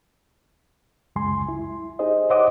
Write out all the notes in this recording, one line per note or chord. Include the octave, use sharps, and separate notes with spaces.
C#2 F#2 G#3 G#5 C6
E4
D#4 G4 G#4 C5 D#5
C5 C#5 D#5 F#5 D6 D#6